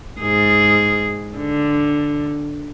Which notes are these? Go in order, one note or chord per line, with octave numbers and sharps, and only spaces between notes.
G#2 G#4
D3